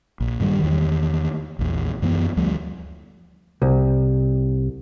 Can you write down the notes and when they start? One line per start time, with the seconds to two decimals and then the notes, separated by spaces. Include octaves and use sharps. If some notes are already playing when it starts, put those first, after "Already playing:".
0.20 A#1
0.40 G2 D#3 F#3 G3
0.59 E2 D#3
1.59 A#1 E2
2.02 F#2 E3 G#3 B3
2.37 D2 F3 G3 A3
3.62 C2